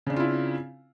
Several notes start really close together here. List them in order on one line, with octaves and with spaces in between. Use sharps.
C#3 D4 C4 F4 E4